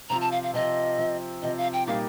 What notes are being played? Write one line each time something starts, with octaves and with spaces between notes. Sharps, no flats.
C3 F3 C4 F4 A#5
A5
F5
F5
C3 F3 C4 F4 D#5
C3 F3 C4
C3 F3 C4 D#5
F5
G5
A#2 G3 A#3 D#4 G4 F5